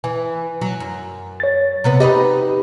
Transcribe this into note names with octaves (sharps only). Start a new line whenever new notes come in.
E3 G#5
F#3
F#2
C#5 A6
C3 B3 B4
D#4 G4 B4 D#5 B5